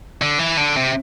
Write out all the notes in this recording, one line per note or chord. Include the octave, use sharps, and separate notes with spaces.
D3
E3
D3
C3